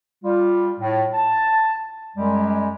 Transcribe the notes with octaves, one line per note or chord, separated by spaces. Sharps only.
G3 F4
A2
A5
F#2 G3 G#3